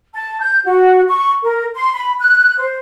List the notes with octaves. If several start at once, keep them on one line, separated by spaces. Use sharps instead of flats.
A5
G6
F#4
C#6
A#4
C6
B5
F#6
C5